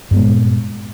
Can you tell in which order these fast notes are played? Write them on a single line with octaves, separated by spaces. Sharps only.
G2 B3 G#3 A#2